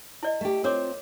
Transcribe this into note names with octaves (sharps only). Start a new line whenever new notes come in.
E4 D5 D#5
A3 G4
C4 F4 A#4 C5 C#5 D6